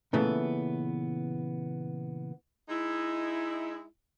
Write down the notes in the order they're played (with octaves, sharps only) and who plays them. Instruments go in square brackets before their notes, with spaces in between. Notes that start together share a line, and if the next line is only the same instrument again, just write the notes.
[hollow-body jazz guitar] A#2 C#3 E3 A3 B3
[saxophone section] G#3 D#4 E4